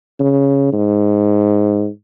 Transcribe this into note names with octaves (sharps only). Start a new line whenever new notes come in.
C#3
G#2